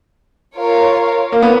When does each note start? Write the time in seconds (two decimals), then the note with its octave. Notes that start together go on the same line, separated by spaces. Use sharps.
0.56 F4 A#4 C#5 F5
1.32 A#3
1.42 B3